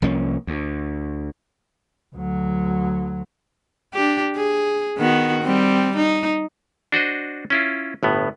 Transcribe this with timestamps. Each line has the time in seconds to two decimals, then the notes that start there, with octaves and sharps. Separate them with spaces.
0.02 C2 F3 A#3 C#4
0.47 D2
2.16 D2 F#3
3.94 D4 G4
4.36 G#4
4.98 D#3 B3 F#4
5.43 G3 C4
5.96 D#4
6.92 D4 F#4 C5 D#5
7.50 C#4 E4 F4
8.03 G1 A2 B3